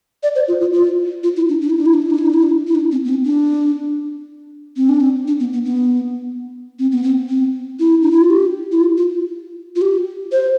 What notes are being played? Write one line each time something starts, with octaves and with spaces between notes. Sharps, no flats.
D5
C5
F4
F4
F4
F4
E4
D4
D4
E4
D4
E4
D4
E4
D4
E4
D4
E4
D4
E4
D4
C4
B3
C4
D4
C4
D4
C4
D4
B3
B3
B3
C4
B3
C4
C4
E4
D4
E4
F4
G4
E4
F4
F4
F4
G4
C5